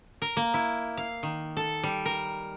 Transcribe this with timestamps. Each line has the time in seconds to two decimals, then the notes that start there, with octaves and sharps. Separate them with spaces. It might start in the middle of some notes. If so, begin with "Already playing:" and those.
0.22 A#4
0.37 A#3
0.54 E4
0.97 F5
1.23 D#3
1.57 A4
1.83 G3
2.05 A#4